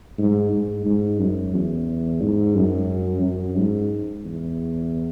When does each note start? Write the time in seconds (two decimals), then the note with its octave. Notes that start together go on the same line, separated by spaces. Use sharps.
0.19 G#2
0.53 G#2
0.86 G#2
1.20 F#2
1.54 E2
2.21 G#2
2.56 F#2
3.23 F#2
3.57 G#2
4.25 E2